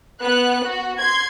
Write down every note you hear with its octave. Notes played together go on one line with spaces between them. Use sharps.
B3 F#6
F#4
C6 G#6